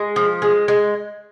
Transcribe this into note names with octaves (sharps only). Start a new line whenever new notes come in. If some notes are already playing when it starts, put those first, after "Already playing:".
Already playing: G#3
F3
G#3
G#3